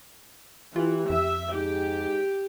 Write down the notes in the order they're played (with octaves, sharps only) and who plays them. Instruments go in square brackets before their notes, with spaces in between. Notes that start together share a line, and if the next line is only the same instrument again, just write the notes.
[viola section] E3 [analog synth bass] F4 [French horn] G4
[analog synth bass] F2 [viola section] E5
[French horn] G#2 [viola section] G4